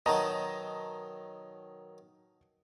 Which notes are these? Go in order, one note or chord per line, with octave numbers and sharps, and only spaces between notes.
B2 D#3 F#3 D#5 A5 A#5